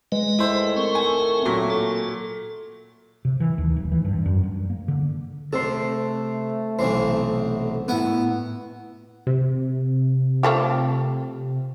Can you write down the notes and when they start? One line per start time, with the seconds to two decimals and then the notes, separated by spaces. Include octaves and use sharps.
0.12 G#3 B4 D#5
0.39 A2 D#3 A3 E4 C5
0.77 C4 A#4 C#6
0.95 G#5
1.45 A#2 F#3
1.70 A4
3.25 C3
3.40 E3
3.58 D#2
3.77 D1
3.92 E3
4.05 G2
4.26 F#2
4.43 G2
4.70 A#3
4.88 D3
5.53 C3 A3 A4 C5
6.79 B1 C3 E3 C5
7.88 A2 B3 E4 F#5
9.27 C3
10.43 F3 A3 G4